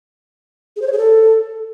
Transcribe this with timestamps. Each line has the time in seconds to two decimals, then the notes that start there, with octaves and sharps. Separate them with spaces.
0.76 G#4
0.82 C5
0.87 C#5
0.92 G#4
0.98 A4